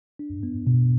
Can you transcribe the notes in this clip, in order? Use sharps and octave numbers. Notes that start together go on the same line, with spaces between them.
D4
B3
B2